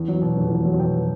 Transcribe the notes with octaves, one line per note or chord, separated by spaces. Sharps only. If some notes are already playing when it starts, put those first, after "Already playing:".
Already playing: E2
F#3
B2
F1
E2
F#3
B2 G5